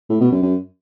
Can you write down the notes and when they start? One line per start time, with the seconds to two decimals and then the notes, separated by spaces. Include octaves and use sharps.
0.09 A2
0.20 B2
0.31 F#2
0.42 F#2